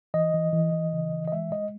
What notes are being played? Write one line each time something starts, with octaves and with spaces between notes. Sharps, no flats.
E3 D#5
E3
E3
E3
C#3
E3
D#5
G#3 E5
G#3 D#5